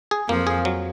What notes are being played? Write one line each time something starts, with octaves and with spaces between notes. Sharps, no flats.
G#4
F2 F3 A#3
G#4
F#3